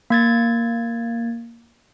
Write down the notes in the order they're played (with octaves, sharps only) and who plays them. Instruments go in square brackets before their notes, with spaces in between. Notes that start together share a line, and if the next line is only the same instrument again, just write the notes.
[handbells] A#3 G#6 A6